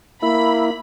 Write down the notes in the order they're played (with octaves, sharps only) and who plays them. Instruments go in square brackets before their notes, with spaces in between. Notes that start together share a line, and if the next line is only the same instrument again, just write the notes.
[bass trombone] A#3 [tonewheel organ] E4 [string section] B5